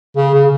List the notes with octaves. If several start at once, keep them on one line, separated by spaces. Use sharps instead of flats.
C#3
C#3